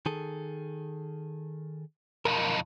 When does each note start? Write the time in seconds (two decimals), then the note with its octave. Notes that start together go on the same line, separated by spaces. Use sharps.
0.06 D#3 G#4 A4
2.25 B1 F2 A#4